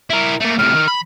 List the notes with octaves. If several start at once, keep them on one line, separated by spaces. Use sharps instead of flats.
E4 A#4
A3 A#3
A2 C3 F6
D#3
B5